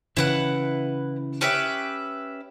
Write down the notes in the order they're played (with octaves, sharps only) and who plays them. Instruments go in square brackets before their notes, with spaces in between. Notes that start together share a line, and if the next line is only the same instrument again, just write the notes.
[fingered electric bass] C#3 E3 [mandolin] E4 B4 F#5
[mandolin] C#4 G4 B4 E5